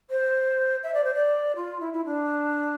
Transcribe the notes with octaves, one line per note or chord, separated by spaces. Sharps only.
C5
E5
D5
C5
D5
F4
E4
E4
D4